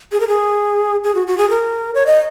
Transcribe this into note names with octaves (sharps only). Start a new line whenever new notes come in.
G#4
A#4
G#4
G#4
F#4
F#4
G#4
A#4
C#5
D#5